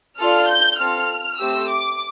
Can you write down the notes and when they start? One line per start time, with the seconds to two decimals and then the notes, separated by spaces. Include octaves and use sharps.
0.19 D4 F4 A4 F6
0.49 G6
0.79 C4 F4 A4 F6
1.40 A3 C4 G4 E6
1.70 D6